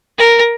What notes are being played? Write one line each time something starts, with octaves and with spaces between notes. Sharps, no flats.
A#4